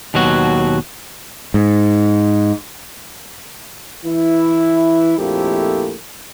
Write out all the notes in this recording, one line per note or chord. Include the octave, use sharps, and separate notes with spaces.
D#2 B2 F#3 F#4
G#2
E3 E4
A#1 F2 A3 A#3 E4 G4